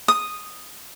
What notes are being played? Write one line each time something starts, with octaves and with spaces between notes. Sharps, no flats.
D#6